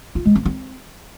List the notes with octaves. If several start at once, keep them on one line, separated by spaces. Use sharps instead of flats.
F4
G#3
C4
C4